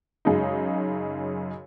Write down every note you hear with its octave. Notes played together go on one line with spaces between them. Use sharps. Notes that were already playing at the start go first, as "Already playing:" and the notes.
F#2 C#3 G#3 D#4